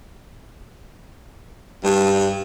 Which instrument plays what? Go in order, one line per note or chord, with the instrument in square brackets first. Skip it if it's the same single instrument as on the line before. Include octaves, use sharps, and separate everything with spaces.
[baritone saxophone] G2 [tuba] G3